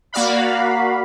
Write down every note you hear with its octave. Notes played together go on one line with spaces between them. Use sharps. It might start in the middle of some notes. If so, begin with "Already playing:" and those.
A#3 F#4 D5 F5 B5